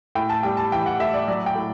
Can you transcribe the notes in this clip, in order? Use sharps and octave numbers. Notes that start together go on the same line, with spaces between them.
A2 G5
A5
G3 G5
A5
E3 G5
F#5
A2 E5
D5
F#3 D5
G5
A2